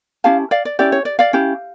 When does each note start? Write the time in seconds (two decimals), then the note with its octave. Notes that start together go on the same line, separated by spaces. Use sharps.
0.24 C#4 E4 G4 F5 A5
0.51 D5 F5
0.65 D5
0.79 C#4 E4 G4 D5
0.92 C#5
1.05 D5
1.19 D5 F5
1.33 C#4 E4 G4